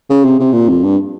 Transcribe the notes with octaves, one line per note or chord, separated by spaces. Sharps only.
C#3
C3
C3
A#2
F2
G2